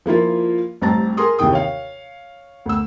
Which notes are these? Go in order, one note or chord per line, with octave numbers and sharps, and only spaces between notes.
F3 A#3 E4 F4
A1 G2 C4 A5 A#5 A6
G#4 A#4 C6 D#6
D#2 C3 E3 G5 D#6
C#5 F5
D2 E6